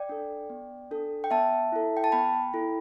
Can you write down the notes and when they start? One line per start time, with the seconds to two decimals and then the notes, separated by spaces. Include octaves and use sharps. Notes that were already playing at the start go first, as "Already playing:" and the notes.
Already playing: D5 G5
0.09 D4 A4
0.50 B3
0.91 D4 A4
1.24 G5
1.31 B3 E5 A5
1.72 E4 A4
1.97 G5
2.04 A5
2.12 B3 G5 B5
2.53 E4 A4